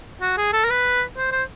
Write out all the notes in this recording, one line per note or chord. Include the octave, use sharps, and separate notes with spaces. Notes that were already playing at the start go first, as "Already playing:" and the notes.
F#4
G#4
A4
A#4
B4
C5
C5